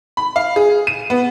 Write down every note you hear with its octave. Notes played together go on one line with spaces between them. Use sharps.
B5
F5
G#4
D#7
B3